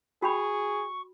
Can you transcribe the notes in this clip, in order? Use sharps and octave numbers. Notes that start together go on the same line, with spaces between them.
F#4 G#4 G5 B5 C#6